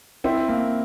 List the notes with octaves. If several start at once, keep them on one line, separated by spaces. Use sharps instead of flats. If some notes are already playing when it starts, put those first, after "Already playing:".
C4 E4
A#3